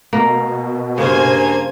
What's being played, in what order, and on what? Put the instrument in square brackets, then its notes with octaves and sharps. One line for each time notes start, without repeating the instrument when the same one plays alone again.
[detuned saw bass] B2 [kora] A#3
[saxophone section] G2 A#3 [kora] C#3 [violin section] C5 G#5 G#6